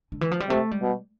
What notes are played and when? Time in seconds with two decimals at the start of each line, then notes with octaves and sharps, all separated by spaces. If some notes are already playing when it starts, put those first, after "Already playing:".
0.12 D3
0.21 E3
0.31 F3
0.40 G3
0.49 C3 A3
0.71 G3
0.82 B2